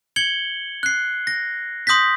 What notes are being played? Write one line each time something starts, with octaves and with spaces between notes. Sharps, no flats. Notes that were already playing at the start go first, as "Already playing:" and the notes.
G#6 C#7 F#7 G7
F#6 C7
A#6
C6 D#6 G6 A#6 B6